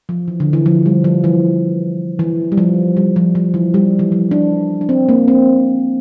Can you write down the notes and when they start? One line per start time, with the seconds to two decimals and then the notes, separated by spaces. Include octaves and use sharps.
0.09 F3
0.28 E3
0.40 D3
0.53 E3
0.66 F3
0.86 G3
1.04 F3
1.24 E3
2.19 E3
2.52 G3
2.58 F3
2.97 G3
3.16 F3
3.35 F3
3.54 E3
3.74 G3
3.99 E3
4.12 F3
4.31 D4
4.81 D4
4.89 C4
5.09 A#3
5.28 C4